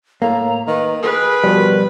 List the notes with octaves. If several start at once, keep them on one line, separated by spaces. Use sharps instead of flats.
A2 A#3 A#5
D#3 B4
G#4 A#4 B4
B2 F3 G3